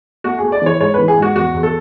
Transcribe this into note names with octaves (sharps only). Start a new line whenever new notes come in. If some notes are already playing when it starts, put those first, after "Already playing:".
A3 F#4
A3 G#4
D5
E3 C#5
G#2 C#5
E3 B4
G#4
G#2 F#4
E2 F#4
E2
A4